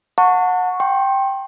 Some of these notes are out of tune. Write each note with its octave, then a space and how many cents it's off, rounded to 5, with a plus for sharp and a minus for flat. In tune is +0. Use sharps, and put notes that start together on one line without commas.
F#5 -25 A5 +35 C#6 +0
G5 +0 C6 +35